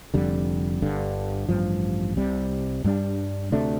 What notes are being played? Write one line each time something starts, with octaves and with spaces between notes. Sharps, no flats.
F1 F2 D3 G3
G1 G2 D3
A1 G2 F3
C2 C3 G3
G2 G3 D4
D2 C3 A3 D4